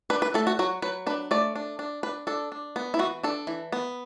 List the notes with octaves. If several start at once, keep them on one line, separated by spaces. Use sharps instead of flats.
D4 B4
B4
A3 A4
F#4
F#3 F#4
F#3 B4
D4 B4
A3 D5
D4
D4
D4 B4
D4 A4
D4
B3
E4
E3 F#4
D4 A4
E3
B3